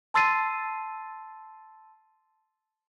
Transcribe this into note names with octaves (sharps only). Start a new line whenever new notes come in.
A5 C6 E6 A6 C7 D#7